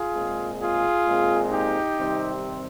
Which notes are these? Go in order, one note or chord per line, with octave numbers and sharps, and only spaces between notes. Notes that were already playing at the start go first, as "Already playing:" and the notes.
Already playing: F4 G#4
A#2 G#3 C4
F4 G#4
A#2 G#3 C4
D#4 G4
C3 D#3 G3 C4